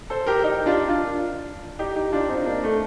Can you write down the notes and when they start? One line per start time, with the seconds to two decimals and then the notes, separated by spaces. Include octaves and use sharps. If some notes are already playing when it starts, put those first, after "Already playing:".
0.10 A4 C5
0.26 G4 A#4
0.43 D#4 G4
0.66 D4 F4
0.88 D4 F4
1.79 D#4 G4
1.96 D#4 G4
2.12 D4 F4
2.29 C4 D#4
2.46 A#3 D4
2.64 A3